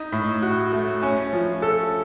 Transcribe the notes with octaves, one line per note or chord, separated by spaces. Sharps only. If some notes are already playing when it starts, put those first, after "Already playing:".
Already playing: D#4
A2
F#4
A3
C#4
F3
A4